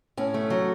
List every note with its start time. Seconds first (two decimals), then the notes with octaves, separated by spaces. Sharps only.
0.17 A2 C#4
0.34 A3
0.50 F#3